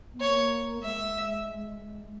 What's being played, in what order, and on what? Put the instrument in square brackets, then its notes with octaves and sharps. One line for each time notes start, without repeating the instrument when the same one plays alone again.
[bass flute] B3
[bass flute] A#3 [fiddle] C#5
[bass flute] G#3 [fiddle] E5